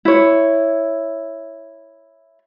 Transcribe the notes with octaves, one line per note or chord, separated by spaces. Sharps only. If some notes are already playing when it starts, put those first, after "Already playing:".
E4 C#5